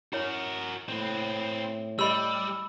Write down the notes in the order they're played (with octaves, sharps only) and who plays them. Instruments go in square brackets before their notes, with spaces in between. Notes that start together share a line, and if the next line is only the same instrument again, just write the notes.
[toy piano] E4 C#5 [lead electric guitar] F#4 A#4
[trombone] A2 [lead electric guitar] C4 B4
[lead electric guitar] G3 [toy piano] G4 D#5 [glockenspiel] B5 E6